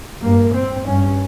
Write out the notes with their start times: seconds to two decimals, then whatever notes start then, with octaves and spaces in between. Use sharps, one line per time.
0.22 G2 A#3
0.54 C4
0.86 G2 C#4